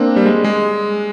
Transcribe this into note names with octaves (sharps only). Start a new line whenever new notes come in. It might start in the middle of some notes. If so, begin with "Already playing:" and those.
Already playing: A#3 C4 D4
G3
G#3
G#3